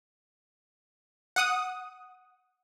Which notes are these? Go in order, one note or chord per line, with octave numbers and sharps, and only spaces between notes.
F#5 D#6